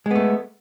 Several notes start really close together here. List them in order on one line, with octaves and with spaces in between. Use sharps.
G#3 B3 A3